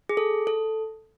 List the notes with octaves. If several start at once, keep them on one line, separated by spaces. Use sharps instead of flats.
G#4
A4
A4